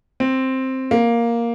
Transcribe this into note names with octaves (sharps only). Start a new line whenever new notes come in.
C4
A#3